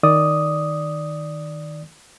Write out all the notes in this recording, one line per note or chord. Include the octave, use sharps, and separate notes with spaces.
D#3 D5 D#6